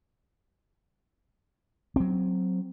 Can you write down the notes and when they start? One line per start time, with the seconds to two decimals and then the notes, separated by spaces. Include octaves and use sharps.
1.96 F#3 C4